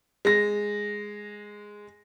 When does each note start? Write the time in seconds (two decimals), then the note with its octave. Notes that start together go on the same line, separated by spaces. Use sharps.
0.25 G#3 A#6